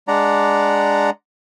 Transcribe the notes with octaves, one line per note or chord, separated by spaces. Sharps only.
G#3 D4 D5 F#5 A#5